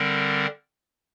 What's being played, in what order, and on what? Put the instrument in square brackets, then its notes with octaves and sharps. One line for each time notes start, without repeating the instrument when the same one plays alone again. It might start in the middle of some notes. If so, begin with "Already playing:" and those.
Already playing: [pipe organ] D3 G3 C4 A#4